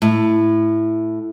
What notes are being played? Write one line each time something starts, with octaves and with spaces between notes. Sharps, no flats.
A2